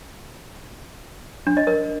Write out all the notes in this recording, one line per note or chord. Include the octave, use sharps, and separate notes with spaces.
D4
D#5
A#4